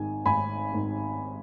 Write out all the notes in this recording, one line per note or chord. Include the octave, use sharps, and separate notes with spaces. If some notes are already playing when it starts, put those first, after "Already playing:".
Already playing: G#1 G#2 D#3 G#5
G#1 G#5 B5
G#2 D#3